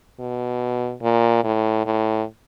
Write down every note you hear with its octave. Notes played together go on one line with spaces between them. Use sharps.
B2
A#2
A2
A2